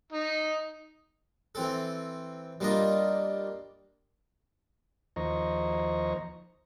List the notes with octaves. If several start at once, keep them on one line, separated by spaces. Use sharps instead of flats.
D#4
E3 C4 A4
G3 A#3 D4 F4 D#5
D#2 F3 C5 D#5 A#5 C#6